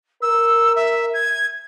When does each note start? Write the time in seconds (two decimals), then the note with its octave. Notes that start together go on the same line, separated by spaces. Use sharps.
0.22 A#4 E6
0.76 E5
1.14 G#6